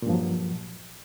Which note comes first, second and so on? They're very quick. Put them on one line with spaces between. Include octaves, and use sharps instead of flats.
A#2 G2 F3 F#3